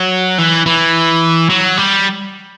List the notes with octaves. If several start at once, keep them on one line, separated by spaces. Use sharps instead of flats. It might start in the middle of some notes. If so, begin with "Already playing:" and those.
Already playing: F#3
E3
E3
F#3
G3